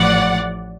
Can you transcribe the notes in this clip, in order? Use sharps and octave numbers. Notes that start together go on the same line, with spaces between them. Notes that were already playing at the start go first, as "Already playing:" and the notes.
Already playing: A1 A2 F3 D5 F#5